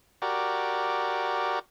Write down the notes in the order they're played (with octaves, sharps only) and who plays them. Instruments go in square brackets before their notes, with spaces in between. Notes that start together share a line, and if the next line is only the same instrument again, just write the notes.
[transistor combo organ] F#4 G4 A#4 D5